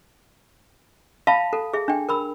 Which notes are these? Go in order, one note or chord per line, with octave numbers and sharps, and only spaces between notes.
E5 F5 A5 B5
A4
G#4 E5
D4 G5
A#4 B5 E6